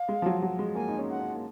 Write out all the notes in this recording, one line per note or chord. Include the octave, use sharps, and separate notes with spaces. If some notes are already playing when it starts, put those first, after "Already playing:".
Already playing: F5
G#3
F3
F#3
F#3
G#3
A#3 G#5
D#4
C#4
F#5
C#4
A#3